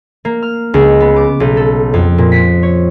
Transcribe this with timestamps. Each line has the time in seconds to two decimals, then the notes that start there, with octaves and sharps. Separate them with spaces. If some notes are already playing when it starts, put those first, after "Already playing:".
0.25 A#3
0.42 F6
0.74 C#2
1.00 B3
1.16 D6
1.40 B1
1.57 A4
1.94 F2
2.18 A#2
2.32 B6
2.63 C#5